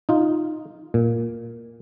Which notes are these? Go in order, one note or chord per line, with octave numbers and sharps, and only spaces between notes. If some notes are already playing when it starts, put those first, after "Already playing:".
D#4 F4
A#2